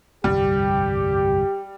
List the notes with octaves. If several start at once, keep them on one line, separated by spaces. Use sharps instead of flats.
G1 C2 F2 G3 G4